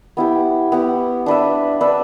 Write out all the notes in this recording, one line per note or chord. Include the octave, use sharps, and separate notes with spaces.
B3 E4 G4
B3 E4 G4
D4 B4 E5
D4 B4 E5